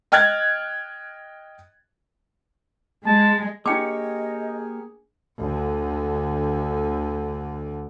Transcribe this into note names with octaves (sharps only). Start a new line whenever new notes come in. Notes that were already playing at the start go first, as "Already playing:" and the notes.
D#5 G5 F6 F#6 G#6 A6
G#3 A5
A#3 D4 G4 G#4 C#5 D#5 G5 D6
D2 D3